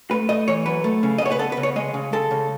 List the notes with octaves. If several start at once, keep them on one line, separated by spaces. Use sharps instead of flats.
A3 B4
A3 D#5
E3 C#5
F#2 B4
A3
C#3
D#5
B3 C#5
B4
B3 A4
B4
C#3
C#5
G#3 D#5
C#3
G#3 A4
C#3